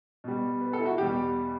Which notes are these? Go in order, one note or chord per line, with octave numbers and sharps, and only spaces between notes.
B2 G3
B4
A4
E4
F#4
E2 B2 G3 G4